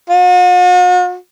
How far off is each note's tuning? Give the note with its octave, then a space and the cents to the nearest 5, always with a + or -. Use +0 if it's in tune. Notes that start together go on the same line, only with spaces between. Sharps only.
F#4 -45